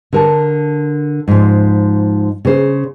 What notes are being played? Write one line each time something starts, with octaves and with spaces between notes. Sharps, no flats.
D3 A#4 A5
G#2 F3
C#3 C5